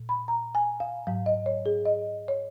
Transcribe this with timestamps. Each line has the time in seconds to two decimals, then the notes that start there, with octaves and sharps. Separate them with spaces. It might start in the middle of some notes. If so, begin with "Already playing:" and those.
Already playing: A#2
0.09 B5
0.28 A#5
0.55 G#5
0.80 F5
1.07 G#2 F#3 F5
1.26 D#5
1.46 C#5
1.66 G#4
1.85 D#5
2.28 C#5